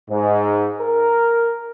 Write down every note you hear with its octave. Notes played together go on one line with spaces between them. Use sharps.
G#2
A#4